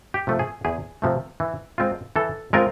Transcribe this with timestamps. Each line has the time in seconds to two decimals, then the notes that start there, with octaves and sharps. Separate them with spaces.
0.14 G4
0.27 C3 F3 A3
0.39 G#4
0.65 E2 G#4
1.02 C3 F3 A3
1.40 E3
1.78 G#3 C4 F4
2.16 E3 A4
2.53 G#3 C4 F4 A#4